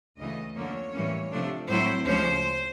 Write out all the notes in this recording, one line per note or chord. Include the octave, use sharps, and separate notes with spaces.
D2 C#3 E3 A3 D#5
F2 D3 F3 A#3 C#4 C#5
A2 E3 G3 A#3 C#4
C3 F3 A3 D4
A2 F#3 A3 C4 E4 C5
D2 C#3 F3 G#3 C#4 C5